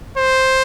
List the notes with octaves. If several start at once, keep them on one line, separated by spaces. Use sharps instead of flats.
C5